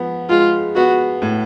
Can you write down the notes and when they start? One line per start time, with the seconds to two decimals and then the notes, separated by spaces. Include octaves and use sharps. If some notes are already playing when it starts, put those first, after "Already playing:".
Already playing: F3 B3
0.29 G#3 F4
0.76 B3 F#4
1.22 A2